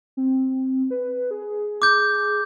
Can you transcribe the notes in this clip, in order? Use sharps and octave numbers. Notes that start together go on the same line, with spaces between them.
C4
B4
G#4
D6 G6